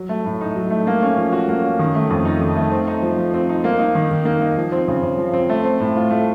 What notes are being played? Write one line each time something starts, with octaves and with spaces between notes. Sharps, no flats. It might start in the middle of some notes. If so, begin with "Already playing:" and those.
Already playing: F#3
A3
A2
D#4
F#3
A3
A#3
C#4
F3
F#4
A#3
C#4
D#3
A3
F2
D#4
D#3
A3
C4
D#4
F3
F3
C4
D#4
A#3
D#4
D#3
D#3
A#3
D#4
F3
C4
C#3
C#3
F3
C4
A3
C4
A2
F4
A3